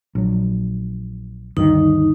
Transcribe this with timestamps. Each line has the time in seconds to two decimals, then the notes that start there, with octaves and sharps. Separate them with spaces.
0.15 A#1 F#3
1.57 D2 G2 D#3 D#4